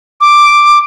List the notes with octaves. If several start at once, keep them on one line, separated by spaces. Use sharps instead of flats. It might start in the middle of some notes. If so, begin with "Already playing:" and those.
D6